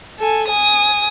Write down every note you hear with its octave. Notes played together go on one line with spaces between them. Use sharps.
A4 G#5
G#5 D#6